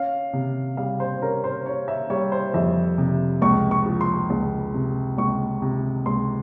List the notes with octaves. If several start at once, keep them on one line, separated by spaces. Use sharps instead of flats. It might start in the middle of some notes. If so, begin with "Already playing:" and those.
Already playing: C#4 F5
C3
G3 F5
C5
C#4 A#4
C5
C#4 C#5
E5
G3 C#5
C5
F2 E5
C3
C#2 C#6
C#6
F3
C6
C#2
C3
C#2 C#6
C3
C#2 C6